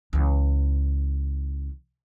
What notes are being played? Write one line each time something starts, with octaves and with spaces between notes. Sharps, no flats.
C#2 E3